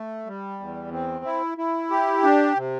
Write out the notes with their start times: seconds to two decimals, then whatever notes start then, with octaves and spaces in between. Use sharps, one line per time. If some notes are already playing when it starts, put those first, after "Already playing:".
Already playing: A3
0.27 G3
0.60 E2
0.92 C4
1.25 E4
1.58 E4
1.91 G4
2.23 D4
2.56 C3